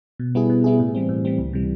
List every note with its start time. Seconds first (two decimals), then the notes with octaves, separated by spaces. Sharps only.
0.20 B2
0.35 G3 B3 E4 G#4
0.50 B2
0.64 G3 B3 E4 G#4
0.80 A2
0.95 E3 G3 C4
1.09 A2
1.25 E3 G3 C4
1.38 C#2
1.53 C3 E3 G3